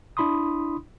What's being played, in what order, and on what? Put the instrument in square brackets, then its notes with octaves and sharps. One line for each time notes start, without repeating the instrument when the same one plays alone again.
[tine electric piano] D4 E4 B5 C6 D#6